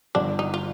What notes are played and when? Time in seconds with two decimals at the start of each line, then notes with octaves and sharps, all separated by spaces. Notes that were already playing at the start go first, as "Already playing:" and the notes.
0.15 G1 D4
0.39 D#4
0.54 F4